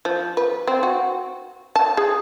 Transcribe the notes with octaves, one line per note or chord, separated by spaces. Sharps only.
F3
B4
C4
F#4
A5
G#4